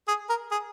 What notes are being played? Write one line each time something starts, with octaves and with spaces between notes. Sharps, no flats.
G#4
A#4
G#4